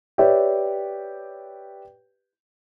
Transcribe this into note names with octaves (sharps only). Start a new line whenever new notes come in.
G4 B4 C#5 D5 E5 G5